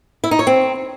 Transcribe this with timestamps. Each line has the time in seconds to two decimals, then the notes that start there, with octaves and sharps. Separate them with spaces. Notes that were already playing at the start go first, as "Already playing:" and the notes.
0.24 E4
0.31 D#4
0.39 C#5
0.47 C4